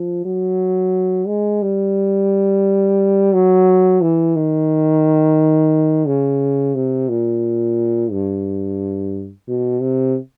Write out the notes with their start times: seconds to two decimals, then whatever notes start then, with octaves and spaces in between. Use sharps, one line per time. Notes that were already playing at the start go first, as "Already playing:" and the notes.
Already playing: F3
0.26 F#3
1.27 G#3
1.62 G3
3.33 F#3
4.01 E3
4.36 D#3
6.07 C#3
6.75 C3
7.09 A#2
8.12 G2
9.49 B2
9.82 C3